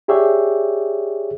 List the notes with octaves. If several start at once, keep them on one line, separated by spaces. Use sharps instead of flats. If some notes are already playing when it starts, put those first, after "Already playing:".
G4 G#4 C#5 D5 E5 G5